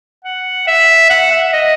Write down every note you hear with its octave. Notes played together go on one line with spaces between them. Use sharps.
F#5
E5
F#5
E5
D#5